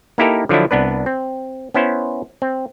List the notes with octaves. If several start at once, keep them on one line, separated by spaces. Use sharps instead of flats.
A#3 D#4 E4 G4 A4 A#4
D3 F3 F#3 D4 E4
C2 B3 D4 B4
C4
B3 C#4 E4 C5
C4